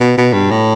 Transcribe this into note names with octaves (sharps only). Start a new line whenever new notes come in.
B2
B2
G2
A2